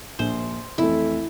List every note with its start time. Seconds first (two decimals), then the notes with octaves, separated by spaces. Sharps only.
0.19 A#1 C5
0.78 F2 E3 A3 E4